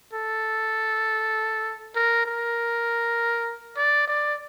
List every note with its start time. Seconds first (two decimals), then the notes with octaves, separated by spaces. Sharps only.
0.13 A4
1.95 A#4
2.25 A#4
3.77 D5
4.08 D5